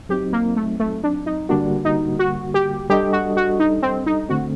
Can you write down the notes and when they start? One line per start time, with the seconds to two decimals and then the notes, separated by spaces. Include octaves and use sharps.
0.09 F#3 C4 D#4 G4
0.33 A#3
0.56 A3
0.80 A3
1.03 D4
1.26 D#4
1.49 D3 G3 A#3 D4 F#4
1.85 D#4
2.19 F#4
2.54 G4
2.89 G3 D4 G4 A4 D#5
3.13 F#4
3.37 F#4
3.60 D#4
3.82 C4
4.06 D#4
4.29 D3 A3 C4 F#4